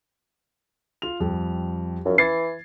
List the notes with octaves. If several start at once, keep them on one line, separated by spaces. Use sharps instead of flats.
F4 F7
F2 G3
F#2 F3 C#4
E3 G#6 A6 C7